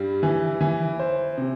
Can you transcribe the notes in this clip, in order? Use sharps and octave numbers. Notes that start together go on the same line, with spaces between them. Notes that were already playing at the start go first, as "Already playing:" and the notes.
Already playing: G2 G3
E3
E3
C5
C3